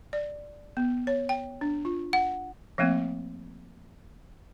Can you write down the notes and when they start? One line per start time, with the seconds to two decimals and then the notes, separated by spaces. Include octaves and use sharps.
0.13 D5
0.77 B3
1.07 C#5
1.29 G5
1.61 D4
1.85 F4
2.13 F#5
2.78 F3 A3 A#3 C4